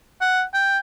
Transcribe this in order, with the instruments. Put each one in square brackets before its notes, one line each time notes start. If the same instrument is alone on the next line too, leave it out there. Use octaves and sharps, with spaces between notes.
[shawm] F#5
G5